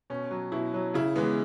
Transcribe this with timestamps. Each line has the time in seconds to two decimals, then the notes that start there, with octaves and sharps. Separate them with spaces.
0.10 B2 C#4
0.31 F#3
0.52 B2 E4
0.74 F#3
0.94 C#3 E4
1.16 E3 G#3 B3